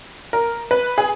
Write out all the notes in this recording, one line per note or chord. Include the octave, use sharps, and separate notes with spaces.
A#4
B4
G#4